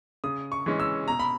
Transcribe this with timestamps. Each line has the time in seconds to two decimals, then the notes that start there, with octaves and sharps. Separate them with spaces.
0.24 C#3 D#6
0.52 C#6
0.66 E3 G#3 C#4
0.80 E6
1.08 B2 A#5
1.19 B5